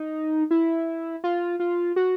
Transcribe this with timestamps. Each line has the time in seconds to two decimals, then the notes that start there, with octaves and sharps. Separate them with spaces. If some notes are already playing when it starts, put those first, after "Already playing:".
Already playing: D#4
0.51 E4
1.24 F4
1.60 F4
1.96 F#4